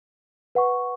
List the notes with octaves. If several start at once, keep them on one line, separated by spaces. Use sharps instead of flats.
B4 F#5 C#6